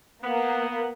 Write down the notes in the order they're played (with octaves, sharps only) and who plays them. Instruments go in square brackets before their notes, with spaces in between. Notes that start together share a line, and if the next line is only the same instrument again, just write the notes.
[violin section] A#3 [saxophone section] B3